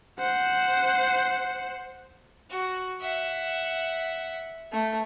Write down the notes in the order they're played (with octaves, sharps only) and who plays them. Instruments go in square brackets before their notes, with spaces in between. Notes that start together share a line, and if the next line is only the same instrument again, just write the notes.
[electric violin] C5 F#5
[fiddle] F#4
E5 F#5
[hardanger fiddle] A3